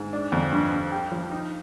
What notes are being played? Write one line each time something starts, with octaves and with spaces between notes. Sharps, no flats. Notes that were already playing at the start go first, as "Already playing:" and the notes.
Already playing: G#2
D4
F2
G2
G2
G4
F3
D#4